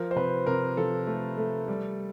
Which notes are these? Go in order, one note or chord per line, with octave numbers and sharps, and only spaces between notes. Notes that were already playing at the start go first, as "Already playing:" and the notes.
Already playing: F3 A#4
C5
C3 B4
C3 A#4
F3 A4
A3
A3
G3